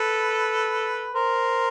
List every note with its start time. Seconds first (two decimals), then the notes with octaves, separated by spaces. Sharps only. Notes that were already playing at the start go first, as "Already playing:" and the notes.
Already playing: A4 B4
1.15 A#4 C5